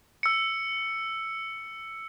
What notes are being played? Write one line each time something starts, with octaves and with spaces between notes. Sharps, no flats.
E6 C#7